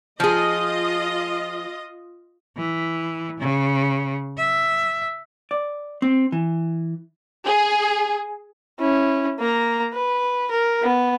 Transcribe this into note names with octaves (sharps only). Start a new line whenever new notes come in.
F3 F4 G#4 D#5
E3
C#3
E5
D5
C4
E3
G#4
C#4 E4
A#3 A#5
B4
A#4
B3